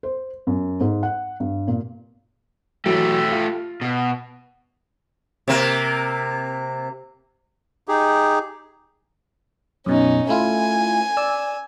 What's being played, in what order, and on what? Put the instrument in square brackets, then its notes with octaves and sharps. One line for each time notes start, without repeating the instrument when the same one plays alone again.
[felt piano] C5
F#2
G#2
F#5
G2
A#2
[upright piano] E3 F#3 D7 [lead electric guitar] A3 G4
[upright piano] F4
[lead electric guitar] B2
[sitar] C3 A#3
[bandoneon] D#4 G4 G#4
[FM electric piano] F#2 B2 [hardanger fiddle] C#4 D#4
[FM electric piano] A3 E4 F4 [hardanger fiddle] G#5
[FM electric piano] D5 E6